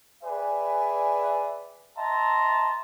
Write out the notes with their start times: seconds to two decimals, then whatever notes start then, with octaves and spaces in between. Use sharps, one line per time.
0.23 G#4 B4 D5 E5 G5 G#5
1.96 D#5 E5 G5 A5 A#5 C6